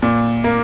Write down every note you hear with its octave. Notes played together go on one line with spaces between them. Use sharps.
A#2
A#3